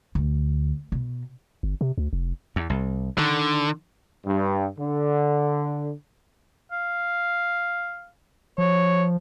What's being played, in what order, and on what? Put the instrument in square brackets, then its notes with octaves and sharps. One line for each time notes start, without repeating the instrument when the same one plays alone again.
[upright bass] D2
B2
[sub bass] G1
C3
D2
F1
[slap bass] E2
C2
[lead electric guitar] D3 [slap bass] D#3
[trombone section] G2
D3
[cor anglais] F5
[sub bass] F3 [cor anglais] C#5